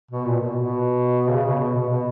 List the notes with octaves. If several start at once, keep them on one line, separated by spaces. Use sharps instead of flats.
B2
A#2
B2
B2
C#3
B2
B2
B2
B2